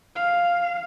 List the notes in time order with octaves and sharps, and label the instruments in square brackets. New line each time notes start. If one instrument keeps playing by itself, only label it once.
[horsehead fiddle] F5